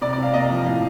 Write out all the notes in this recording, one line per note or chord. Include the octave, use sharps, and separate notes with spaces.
C3 D5
D5
C3 F5
A#3 D#5
F3
A2 F5